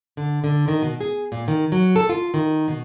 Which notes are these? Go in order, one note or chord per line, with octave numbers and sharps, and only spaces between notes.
D3
D3
D#3
B2
G#4
A#2
D#3
F#3
A4
F4
D#3
B2